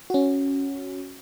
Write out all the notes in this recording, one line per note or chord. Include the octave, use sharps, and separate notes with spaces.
C#4 F#4